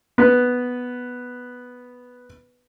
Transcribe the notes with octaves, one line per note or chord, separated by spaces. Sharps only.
B3 B4